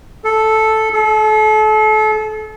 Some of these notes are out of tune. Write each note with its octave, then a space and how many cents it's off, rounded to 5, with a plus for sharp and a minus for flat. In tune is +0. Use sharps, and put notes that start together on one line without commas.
A4 -5
A4 -35